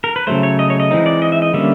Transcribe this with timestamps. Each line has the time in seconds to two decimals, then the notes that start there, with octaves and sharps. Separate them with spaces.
0.04 A#4
0.16 B4
0.27 C#3 F#3 A3 C5
0.43 C#5
0.59 D#5
0.70 C#5
0.80 D#5
0.91 E3 G#3 C4 D#4
1.06 D5
1.22 D#5
1.32 E5
1.42 D#5
1.53 D3 G3 A#3 C#4 E5